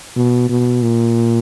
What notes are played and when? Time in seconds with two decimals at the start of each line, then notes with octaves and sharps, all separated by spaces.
0.17 B2
0.50 B2
0.82 A#2